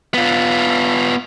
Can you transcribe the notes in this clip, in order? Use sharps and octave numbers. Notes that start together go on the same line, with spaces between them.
B3 F4